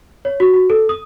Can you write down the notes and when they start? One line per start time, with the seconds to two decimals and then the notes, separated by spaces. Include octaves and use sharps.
0.25 C#5
0.40 F#4
0.53 F#4
0.70 A4
0.89 D#6